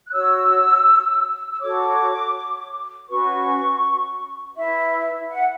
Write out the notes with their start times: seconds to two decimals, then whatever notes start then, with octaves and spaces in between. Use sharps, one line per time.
0.08 F#6
0.12 F#4 C#5 E6
1.51 E6
1.60 F#4 A4 C#5 D6
3.08 C#4 F#4 B4 C#6
4.56 E4 B4 E5
5.30 F#5